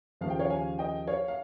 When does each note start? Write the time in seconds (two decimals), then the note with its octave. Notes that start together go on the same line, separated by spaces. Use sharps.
0.21 D#2 C#3 F3 F5
0.30 G5
0.39 C#5 F5
0.50 F5 G#5
0.79 D#5 G5
1.07 C#5 F5
1.28 F5